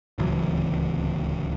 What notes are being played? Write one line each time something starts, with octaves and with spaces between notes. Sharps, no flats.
D1 C#2 E3 F#3